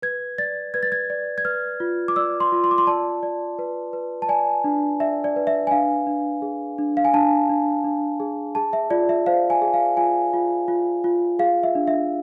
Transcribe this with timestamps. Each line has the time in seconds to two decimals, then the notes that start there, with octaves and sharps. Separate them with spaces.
0.02 B4 G#6
0.38 D5 A6
0.74 B4 G#6
0.83 A6
0.92 G#6
1.10 D5
1.38 G#6
1.45 B4 F6
1.80 F4
2.08 D6
2.16 D5 E6
2.40 C6
2.52 F4
2.64 C6
2.71 D6
2.78 C6
2.87 D5 A5
3.23 D5
3.59 B4
3.93 B4
4.22 A5
4.29 D5 G#5
4.64 D4
5.00 D5 E5
5.24 D5
5.36 B4
5.47 E5
5.67 G#5
5.71 D4 F5
6.07 D4
6.42 G#4
6.78 D4
6.97 F5
7.05 G#5
7.14 D4 A5
7.49 D4
7.84 D4
8.20 G#4
8.55 G#4 A5
8.73 E5
8.90 F4 D5
9.09 E5
9.26 C5 F5
9.50 G#5
9.62 G#4
9.74 F5
9.97 F4 G#5
10.34 F4
10.68 F4
11.04 F4
11.39 G#4 F5
11.63 E5
11.75 D4
11.87 E5